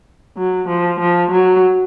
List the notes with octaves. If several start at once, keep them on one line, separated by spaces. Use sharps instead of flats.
F#3
F3
F3
F#3